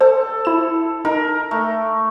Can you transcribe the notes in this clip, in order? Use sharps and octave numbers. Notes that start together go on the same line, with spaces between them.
A4 C5
E4 E7
D#4 A#4
A3